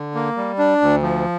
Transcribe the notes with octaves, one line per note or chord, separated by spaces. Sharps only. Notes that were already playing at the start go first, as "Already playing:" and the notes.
Already playing: D3
A#3
G3
D4
D2
F3